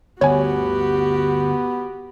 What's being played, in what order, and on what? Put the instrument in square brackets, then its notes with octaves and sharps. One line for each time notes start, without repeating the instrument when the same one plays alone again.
[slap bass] G1 D2 [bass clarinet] B3 [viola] F#4 G4 [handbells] C#5 G#5